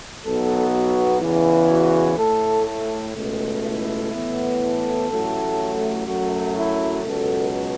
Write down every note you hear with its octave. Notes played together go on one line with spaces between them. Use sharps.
B1 B2 F#3 B3 A4
F#4
E2 C#3 E3
F#4
A2 A3 A4
A4
C#2 B2 A3
E4
A2 E3 B3
A4
A1 A2 F#3 A3
F#2 F#3 A3 F#4
E4
C#2 B2 F#3 A4